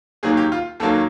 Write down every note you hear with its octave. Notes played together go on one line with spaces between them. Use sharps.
D#2 D#3 F#3 A#3 G#4
G4
F4
D#2 D#3 F#3 A#3 A4